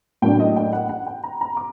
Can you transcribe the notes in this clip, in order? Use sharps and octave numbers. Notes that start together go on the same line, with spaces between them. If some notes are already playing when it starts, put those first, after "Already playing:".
A2 F#3 A#3 D4 G5
D#5
G5
F#5
F#5
G5
A#5
A#5
D6